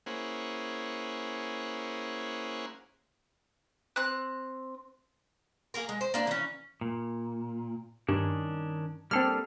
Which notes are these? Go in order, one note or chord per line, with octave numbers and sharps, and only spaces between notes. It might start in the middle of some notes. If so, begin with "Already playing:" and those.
A#3 C#4 E4 G#4 C5 F#5
C4 F#6
A#3 G#4 A#4
G#3
C5
A#3 D4 D5
E3 C#4
A#2
G2 D#3 C#4 D4
G3 A#3 C4 D4 A4 F6